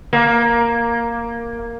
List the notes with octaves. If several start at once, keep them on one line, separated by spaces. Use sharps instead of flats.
A#3